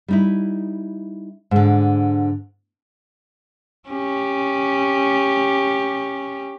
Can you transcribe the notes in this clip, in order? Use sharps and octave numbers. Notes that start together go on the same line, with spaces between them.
G3 D#4 E4
G#2 D3
C#4 G4